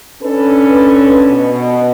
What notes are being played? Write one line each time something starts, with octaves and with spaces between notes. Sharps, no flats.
C#4 D4 A4 B4
B2